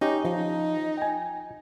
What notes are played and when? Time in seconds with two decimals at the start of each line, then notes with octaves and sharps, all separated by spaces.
0.01 C#4 D#4 G4
0.25 F3 D#4
0.97 G5 G#5